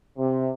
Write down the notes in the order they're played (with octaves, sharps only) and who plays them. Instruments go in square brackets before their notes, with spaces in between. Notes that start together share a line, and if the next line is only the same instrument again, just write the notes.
[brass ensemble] C3